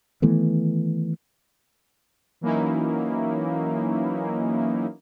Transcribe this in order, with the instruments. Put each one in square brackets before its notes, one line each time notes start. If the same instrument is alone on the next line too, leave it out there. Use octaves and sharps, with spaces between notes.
[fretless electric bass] D#3 E3 A3 B3
[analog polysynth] E3 F#3 A#3 C#4 D#4 E4